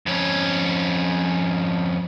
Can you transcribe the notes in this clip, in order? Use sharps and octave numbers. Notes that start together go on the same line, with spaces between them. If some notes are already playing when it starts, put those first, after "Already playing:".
F2 C#4